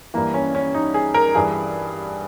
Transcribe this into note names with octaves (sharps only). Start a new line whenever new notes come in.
G2 E3 A#3
C#4
C#4
D#4
G#4
A#4
G2 E3 G#4